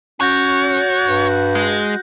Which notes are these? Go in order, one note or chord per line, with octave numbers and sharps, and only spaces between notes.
C#4 F#4 C#5 F#6 G6 A#6
G2
G#3